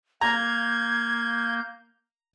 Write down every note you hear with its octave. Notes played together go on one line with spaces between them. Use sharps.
A#3 A#5 G6 G#6